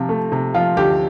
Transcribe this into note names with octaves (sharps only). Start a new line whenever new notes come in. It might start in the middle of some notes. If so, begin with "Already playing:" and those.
Already playing: C3 F3 F4
A3
C3
F3 F4
D2 G4